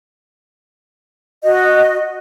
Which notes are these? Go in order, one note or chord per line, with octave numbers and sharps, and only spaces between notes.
F#4 D#5